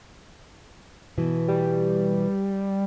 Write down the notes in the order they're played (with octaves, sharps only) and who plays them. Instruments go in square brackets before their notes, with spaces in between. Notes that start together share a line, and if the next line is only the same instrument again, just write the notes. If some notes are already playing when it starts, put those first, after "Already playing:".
[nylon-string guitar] B2 E3
[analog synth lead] G3